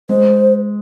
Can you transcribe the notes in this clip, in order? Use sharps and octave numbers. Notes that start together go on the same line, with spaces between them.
G#3 C5